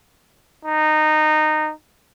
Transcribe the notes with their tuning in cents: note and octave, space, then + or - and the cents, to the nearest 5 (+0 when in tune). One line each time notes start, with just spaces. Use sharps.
D#4 -15